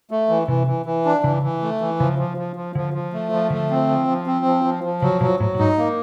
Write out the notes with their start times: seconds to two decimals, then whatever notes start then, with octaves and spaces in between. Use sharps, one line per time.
0.11 A3
0.29 E3
0.48 C3 E3
0.67 E3
0.86 E3
1.05 D4
1.24 C#3 E3
1.43 E3
1.62 A3
1.81 E3
1.99 C#3 F3
2.18 F3
2.37 F3
2.56 F3
2.75 D3 F3
2.94 F3
3.13 A3
3.32 F3
3.50 D3 A3
3.70 C4
3.89 F3
4.07 F3
4.27 C4
4.46 F3
4.64 F3
4.84 F3
5.02 C#3 F#3
5.21 B2 F#3
5.40 A2 F#3
5.54 A2
5.59 G#2 D#4
5.78 A#3